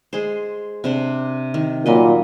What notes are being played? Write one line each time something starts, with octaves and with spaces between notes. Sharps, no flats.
G#3 G#4 C5
C3 D4 C5
D#3
A#2 F#3 G3 D#5